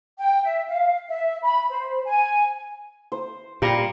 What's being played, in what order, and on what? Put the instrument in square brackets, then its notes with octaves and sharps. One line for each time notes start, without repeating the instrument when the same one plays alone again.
[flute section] G5
E5
F5
E5
B5
C5
G#5
[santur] C5
[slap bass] A#2 [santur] G3 [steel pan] G4 F5 A#5